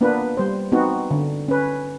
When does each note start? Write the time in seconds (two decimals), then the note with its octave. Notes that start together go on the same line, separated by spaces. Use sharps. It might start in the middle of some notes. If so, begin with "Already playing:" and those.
0.01 A#3 B3 D4 F4 B4
0.37 G3 C5
0.72 B3 C4 D#4 F#4
1.11 D3
1.48 C#4 B4